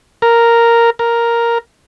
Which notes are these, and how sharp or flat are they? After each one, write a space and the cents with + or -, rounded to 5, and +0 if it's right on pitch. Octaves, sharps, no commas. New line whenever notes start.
A#4 -5
A#4 +0